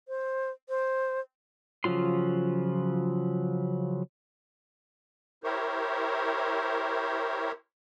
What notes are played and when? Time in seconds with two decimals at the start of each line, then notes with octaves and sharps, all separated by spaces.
0.08 C5
0.69 C5
1.84 C#3 F3 F#3 F4 C6
5.44 E4 G4 A#4 C5 C#5